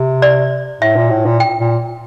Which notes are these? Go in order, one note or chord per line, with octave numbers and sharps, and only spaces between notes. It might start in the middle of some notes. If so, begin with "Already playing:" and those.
Already playing: C3
D5
A2 E5
A#2
A2
A#2
G5
A#2